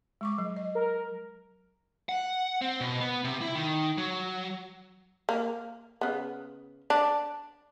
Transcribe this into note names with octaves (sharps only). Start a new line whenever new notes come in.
G#3 C#6 D6
F#3
D#5
A#4
F#5
C4
B2
B3
C3
E4
D#3
F#3
A#3
C#3 B3
D4